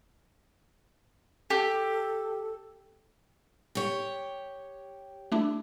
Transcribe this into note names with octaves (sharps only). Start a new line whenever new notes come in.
G4 A4
G4 C#5
A3 D4 E4